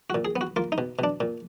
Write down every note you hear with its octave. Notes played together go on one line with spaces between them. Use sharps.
F#4
A#2
G#4
B3
F#4
A#3 F4
D#4
B2
B2 D4
A#2